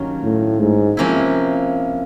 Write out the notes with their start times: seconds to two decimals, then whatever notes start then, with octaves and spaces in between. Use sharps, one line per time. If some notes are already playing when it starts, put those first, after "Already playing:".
Already playing: G2 D#3 F#3 A#3 C#4
0.23 A2
0.60 G#2
0.97 C3 F3 A#3 C#4 E4